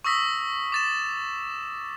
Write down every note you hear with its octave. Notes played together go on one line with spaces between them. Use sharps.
C#6 D#6 E6 A#6 B6
D6 A6 E7